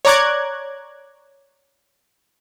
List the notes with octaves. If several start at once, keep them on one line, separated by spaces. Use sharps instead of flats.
C#5 D5 A#5 D6 F#6 G#6